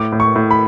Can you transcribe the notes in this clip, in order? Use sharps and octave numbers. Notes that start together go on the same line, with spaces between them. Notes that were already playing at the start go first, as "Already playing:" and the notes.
Already playing: A2 D6
A2
C#6
A2
B5